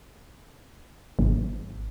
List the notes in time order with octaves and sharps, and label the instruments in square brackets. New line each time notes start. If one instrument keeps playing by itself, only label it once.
[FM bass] G#1